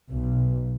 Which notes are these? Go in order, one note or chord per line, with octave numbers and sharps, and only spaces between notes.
B1